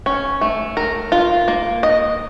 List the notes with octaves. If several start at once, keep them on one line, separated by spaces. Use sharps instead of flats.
C#4
A3
A#4
F4
A#3
D#5